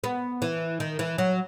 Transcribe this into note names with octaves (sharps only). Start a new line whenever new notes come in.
B3
E3
D#3
E3
F#3